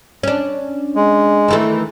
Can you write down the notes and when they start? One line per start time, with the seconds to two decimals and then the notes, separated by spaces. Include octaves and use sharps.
0.23 C#4 D4
0.96 G#3
1.48 D#3 E3 A3